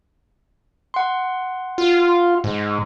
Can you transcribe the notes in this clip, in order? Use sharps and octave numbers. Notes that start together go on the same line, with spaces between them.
F#5 C6
F4
G#2